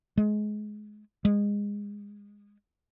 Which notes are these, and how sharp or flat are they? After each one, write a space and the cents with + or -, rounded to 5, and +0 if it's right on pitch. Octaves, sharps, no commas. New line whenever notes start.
G#3 +25
G#3 -20